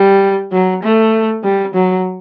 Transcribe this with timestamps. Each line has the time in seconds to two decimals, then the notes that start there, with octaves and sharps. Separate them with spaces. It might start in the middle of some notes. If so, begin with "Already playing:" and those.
Already playing: G3
0.52 F#3
0.83 A3
1.44 G3
1.74 F#3